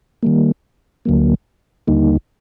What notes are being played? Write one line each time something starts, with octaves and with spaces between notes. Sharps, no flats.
D#3 G3 A#3
D2 D3 F#3 A#3
D#2 D3 G3 A#3 D#4